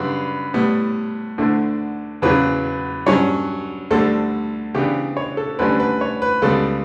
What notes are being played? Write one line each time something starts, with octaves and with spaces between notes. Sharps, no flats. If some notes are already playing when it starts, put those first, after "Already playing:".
Already playing: F#2 C#3 G3 D4 B4
A2 G3 B3
D2 D3 A3 D4
E2 C#3 F#3 C#4 B4
G2 F#3 C#4 C#5
D2 D3 G3 A4
C#3 E3 B3 D4 G4
C#5
A4
D2 D3 G3 C#4 B4
B4
C#5
B4
C#2 C#3 G3 B3 A4